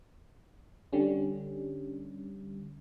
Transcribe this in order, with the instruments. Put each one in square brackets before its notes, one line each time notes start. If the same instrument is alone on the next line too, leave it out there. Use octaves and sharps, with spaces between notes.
[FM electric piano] D3 G3 C#4